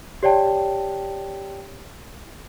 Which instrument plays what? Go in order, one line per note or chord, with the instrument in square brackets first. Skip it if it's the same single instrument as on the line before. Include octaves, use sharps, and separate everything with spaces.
[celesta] G4 C#5 D5 G5 A5